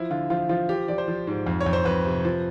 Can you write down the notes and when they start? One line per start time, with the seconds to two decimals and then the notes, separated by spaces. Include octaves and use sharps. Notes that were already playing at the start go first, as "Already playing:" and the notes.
Already playing: F3 E4
0.10 D3 F4
0.30 F3 F4
0.49 F3 F4
0.69 F3 G4
0.88 F3 D5
0.98 C5
1.08 F3
1.27 G#2
1.47 F2
1.61 C#5
1.66 F2
1.73 C5
1.85 F2 B4
2.05 C3
2.25 F3